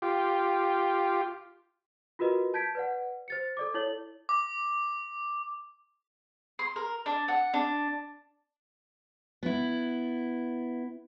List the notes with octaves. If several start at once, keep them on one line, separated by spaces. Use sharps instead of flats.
F4 G4
F4 F#4 A#4 B4 D#5
A5 G6 G#6 B6 D7
B4 D5 F#5
C5 A6 C#7
A4 D5 D6
E4 A4 C#5 F#7
D6
C6
A#4
D4
F#5
D4
B3 E4